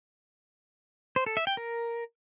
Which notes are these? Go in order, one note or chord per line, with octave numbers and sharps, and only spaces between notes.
C5
A4
E5
G5
A#4